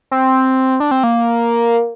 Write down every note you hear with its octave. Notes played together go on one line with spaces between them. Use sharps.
C4
D4
C4
A#3